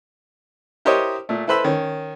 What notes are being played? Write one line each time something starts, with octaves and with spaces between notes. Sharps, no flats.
E4 G4 A#4 C5 C#5 D#5
A#2 A3
E4 A4 B4 C5 B5 E6
D#3 C#4